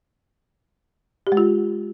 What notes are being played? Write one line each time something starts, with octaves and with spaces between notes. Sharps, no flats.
G4
G#3
F4